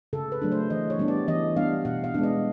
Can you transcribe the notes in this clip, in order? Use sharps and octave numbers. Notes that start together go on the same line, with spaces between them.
C#3 A4
B4
F#3 A3 D4
C5
E3 D#5
C#5
G3 B3 D4
D5
E3 D#5
G3 B3 D4 F5
B2 F#5
F5
G#3 B3 D4
D#5